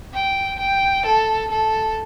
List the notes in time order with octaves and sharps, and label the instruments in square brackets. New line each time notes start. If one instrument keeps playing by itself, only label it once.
[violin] G5
G5
A4
A4